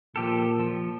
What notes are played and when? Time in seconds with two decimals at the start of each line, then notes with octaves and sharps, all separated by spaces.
0.16 A#2 F3 G4 A4
0.59 F3